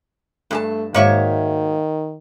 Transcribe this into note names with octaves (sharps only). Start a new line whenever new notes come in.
G2 A3 G#4 A5
G#2 D#3 A#3 F#4 C#5 E5